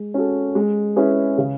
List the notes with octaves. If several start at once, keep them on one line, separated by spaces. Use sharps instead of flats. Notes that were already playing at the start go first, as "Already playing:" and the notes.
Already playing: G#3
C#4 F#4 A4
G#3
C#4 E4 G#4 B4
C#3